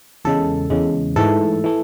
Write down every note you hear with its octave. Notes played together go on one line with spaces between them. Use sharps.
E2 C#3 G#3 A4
E2 C#3 G#3
G#2 E3 A3 A4
E3 A3